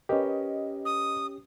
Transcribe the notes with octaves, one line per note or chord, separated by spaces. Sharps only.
C#4 G4 A#4 B4 D#5
D#6